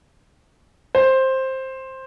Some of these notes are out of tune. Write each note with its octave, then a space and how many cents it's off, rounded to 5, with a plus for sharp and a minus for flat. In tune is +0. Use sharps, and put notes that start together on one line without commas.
C5 +10